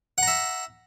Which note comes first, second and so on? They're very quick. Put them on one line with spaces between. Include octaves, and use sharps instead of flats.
F#5 A#5 E5